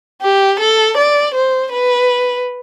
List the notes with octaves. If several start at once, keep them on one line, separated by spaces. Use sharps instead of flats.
G4
A4
D5
C5
B4